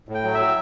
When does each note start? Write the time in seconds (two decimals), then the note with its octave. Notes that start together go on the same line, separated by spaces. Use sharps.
0.09 A2
0.14 G5
0.24 F#3
0.34 E5
0.40 F#3